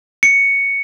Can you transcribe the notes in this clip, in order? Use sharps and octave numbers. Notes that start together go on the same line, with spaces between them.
C#7